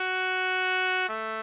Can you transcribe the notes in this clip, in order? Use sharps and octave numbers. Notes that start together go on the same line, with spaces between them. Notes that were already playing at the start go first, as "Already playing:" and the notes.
Already playing: F#4
A3